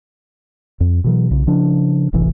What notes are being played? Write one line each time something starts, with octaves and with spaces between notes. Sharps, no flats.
F2
B2 E3 F#3
B1 C#3
C#3 F3 D4
E1 A1 C3 E3